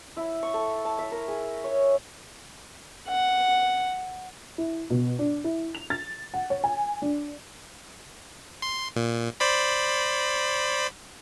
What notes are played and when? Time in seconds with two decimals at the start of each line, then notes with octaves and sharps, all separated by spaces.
0.17 E4
0.43 C#6
0.54 A4
0.85 A5
0.99 E5
1.12 A#4
1.28 G#4
1.64 C#5
3.08 F#5
4.58 E4
4.90 B2
5.19 D4
5.44 E4
5.75 F7
5.90 A6
6.34 F#5
6.50 C#5
6.64 G#5
7.02 D4
8.62 C6
8.96 A#2
9.40 C5 D5 B5